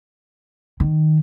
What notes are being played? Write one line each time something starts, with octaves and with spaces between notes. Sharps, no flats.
D#3